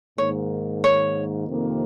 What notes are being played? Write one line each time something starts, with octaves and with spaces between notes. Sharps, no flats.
G#2 D#3 A#3 C#5
C#5
F2 C3 D#3 A#3